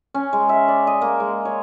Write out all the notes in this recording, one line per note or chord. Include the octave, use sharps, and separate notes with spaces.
C#4
G#3
E5
D5
D#5
A#3
G#3
C#5